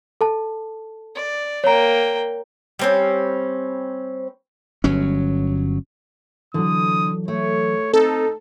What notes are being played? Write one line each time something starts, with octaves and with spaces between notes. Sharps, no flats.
A4 A5
D5
A#3 C#5 G5 A#5
G3 C4 C#4
G1 F#3 C#4
D3 E3 F#3 D#6
A3 C#5
C4 D#4 A4